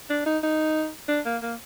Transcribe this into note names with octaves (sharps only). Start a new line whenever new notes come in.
D4
D#4
D#4
D4
A#3
A#3